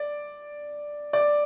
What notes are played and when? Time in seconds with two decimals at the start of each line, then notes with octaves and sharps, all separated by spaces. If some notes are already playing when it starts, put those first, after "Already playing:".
Already playing: D5
1.13 D5